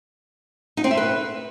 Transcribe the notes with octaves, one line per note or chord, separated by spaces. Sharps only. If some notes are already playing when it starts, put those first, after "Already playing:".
D#4
C4
E5
B4